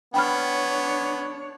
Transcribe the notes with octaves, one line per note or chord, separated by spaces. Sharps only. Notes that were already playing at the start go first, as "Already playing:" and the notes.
B3 D4 C#5 G5 B5 F6